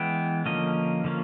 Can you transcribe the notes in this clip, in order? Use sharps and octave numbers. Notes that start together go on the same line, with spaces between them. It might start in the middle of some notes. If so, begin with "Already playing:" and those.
Already playing: E3 G#3 B3 G5
D3 F3 A#3 C#4 D#5
D3 F3 A#3 C#4